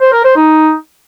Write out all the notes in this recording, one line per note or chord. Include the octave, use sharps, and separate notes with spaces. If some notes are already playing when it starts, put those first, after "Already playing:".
C5
A#4
C5
D#4